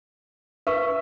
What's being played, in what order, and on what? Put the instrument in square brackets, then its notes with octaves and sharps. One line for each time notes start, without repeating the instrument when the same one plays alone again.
[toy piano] A#4 B4 C#6 [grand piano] E5